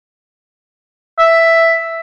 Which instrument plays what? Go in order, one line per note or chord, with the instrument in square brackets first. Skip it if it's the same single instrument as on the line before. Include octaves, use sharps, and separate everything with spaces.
[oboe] E5